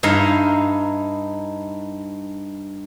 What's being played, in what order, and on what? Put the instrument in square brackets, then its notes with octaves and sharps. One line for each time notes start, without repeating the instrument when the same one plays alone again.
[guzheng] G2 D#4 E4 F5 A#5